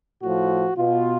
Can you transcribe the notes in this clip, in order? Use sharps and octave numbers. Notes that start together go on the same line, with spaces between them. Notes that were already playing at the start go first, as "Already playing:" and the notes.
A2 F3 F#4
B2 F4